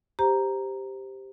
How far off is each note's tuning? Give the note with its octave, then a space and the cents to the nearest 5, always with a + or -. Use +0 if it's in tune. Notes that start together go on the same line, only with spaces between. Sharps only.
G4 +0 C5 +0 A#5 +0